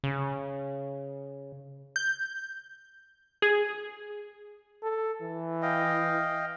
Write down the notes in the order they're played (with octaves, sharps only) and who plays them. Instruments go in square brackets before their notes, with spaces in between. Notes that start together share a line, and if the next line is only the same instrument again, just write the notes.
[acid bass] C#3
[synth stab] G6
G#4
[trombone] A4
E3
[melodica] D#5 F5 G5